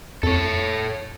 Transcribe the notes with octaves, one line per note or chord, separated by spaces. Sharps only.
F2 A4 C#5